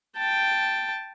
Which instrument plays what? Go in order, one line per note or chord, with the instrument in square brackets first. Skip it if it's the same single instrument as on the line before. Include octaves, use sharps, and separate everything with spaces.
[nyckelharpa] G5 A5